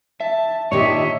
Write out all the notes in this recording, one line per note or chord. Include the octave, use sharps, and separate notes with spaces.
E5 A5
A#2 D#3 D4 G4 C#5 D#5 E5